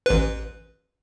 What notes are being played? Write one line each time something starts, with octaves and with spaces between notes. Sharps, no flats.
A1 B4